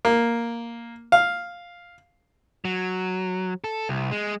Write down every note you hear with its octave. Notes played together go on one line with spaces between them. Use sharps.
A#3
F5
F#3
A4
C2
G#3